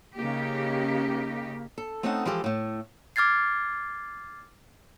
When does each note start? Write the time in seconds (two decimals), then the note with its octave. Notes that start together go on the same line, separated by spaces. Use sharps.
0.15 C#3 A#3 D#4 G4
1.78 A4
2.03 A3 C4 C#4 D#4 A4 F#5
2.25 E3 F3 G#3 G4 A4
2.44 A2 A3
3.16 D6 F6 G#6 A6 C7